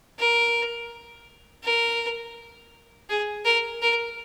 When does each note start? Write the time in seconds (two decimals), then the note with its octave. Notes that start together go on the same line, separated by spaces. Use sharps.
0.19 A#4
1.64 A#4
3.09 G#4
3.45 A#4
3.82 A#4